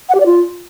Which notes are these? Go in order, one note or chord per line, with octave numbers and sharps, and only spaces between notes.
F#5
G4
D5
F4